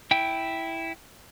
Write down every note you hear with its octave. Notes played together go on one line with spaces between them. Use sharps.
E4 G5